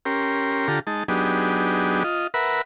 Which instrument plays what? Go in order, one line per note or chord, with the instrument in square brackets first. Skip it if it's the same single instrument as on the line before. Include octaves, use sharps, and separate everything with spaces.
[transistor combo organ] C#4 G4 A#4 C6
D3 F4 G4 A4 A#5
G#3 D#4 A5
F#3 B3 D4 D#4 G4 G#4
F4 D#5
A#4 B4 E5 F#5 B5